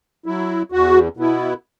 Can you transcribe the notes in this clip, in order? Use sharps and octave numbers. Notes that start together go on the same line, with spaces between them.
F#3 E4
E2 F#4
B2 B3 E4